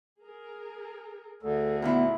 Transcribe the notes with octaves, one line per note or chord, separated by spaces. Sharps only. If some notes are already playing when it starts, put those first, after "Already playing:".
G#4 A#4
D2 A3 G#4 A4
A#2 D3 B3 E4